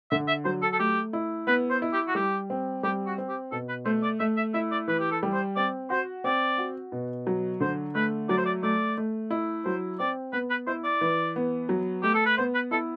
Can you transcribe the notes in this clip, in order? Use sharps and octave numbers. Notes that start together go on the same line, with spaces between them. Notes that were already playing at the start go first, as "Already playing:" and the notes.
D3 E5
E5
F#3 C5
A4
A4
A3 G4
E4
B3 B4
C5
E4
G4
F#4
G3 G4
C4
G3 G4
F#4
C4
G4
B2 A4
B4
A3 C5
D5
A3 E5
E5
E4 E5
D5
E3 B4
G4
A4
G3
C5
C4 D5
F#4 C5
C4 D5
F#4
B2
F#3
D3 C5
A3 B4
F#3 D5
C5
D5
A3 D5
A3
E4
F#3 C5
C4 D5
B3 B4
B4
E4 C5
D5
E3
B3
F#3
A3 G4
A4
B4
B3 C5
B4
E4 A4